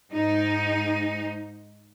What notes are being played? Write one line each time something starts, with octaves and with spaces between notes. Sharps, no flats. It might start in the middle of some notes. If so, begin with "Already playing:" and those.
G#2 D#4